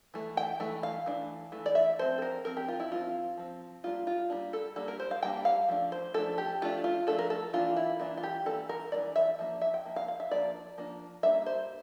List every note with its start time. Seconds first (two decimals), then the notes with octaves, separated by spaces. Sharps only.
0.14 E3 A3
0.37 G5
0.60 E3 A3
0.83 F5
1.06 E3 A3 D4
1.52 E3 A3
1.66 D5
1.75 E5
1.99 F3 C4 C5
2.18 A4
2.22 A#4
2.44 F3 C4 A#4
2.57 G4
2.68 F4
2.80 E4
2.91 F3 C4 F4
3.38 F3 C4
3.84 G3 A#3 D4 F4
4.07 F4
4.30 G3 A#3 D4
4.53 A4
4.76 G3 A#3 D4 A4
4.88 A#4
5.00 C5
5.11 F5
5.23 G3 A#3 D4 G5
5.45 F5
5.68 F3 A3 D4
5.92 C5
6.14 F3 A3 D4 A4
6.38 G4
6.62 F3 A3 D4 F4
6.84 F4
7.07 F3 A3 D4 A4
7.19 A#4
7.30 A4
7.53 E3 A#3 D4 F4
7.77 E4
8.00 E3 A#3 D4 F4
8.18 F4
8.23 G4
8.46 E3 A#3 D4 A4
8.69 A#4
8.92 E3 A#3 D4 D5
9.16 E5
9.39 F3 A#3 D4
9.62 E5
9.74 G5
9.85 F3 A#3
9.96 F5
10.08 F5
10.20 E5
10.31 F3 A#3 D4 D5
10.78 F3 A#3 D4
11.23 G3 A#3 D4 E5
11.46 C5